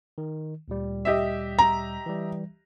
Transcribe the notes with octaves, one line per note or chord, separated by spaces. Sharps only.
D#3
D2 A#2 G3
G4 D#5 E5
A#5
E3 G3